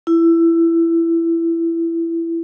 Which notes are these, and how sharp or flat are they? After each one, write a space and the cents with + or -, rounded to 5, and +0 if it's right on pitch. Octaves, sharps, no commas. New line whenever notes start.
E4 +15